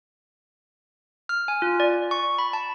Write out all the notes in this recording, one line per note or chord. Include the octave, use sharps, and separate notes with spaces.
F6
G#5
F4
D5
C#6
B5
A5